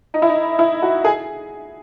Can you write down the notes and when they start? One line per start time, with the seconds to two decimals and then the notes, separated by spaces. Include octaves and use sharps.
0.14 D#4
0.22 E4
0.29 D#4
0.59 E4
0.82 F#4
1.04 G#4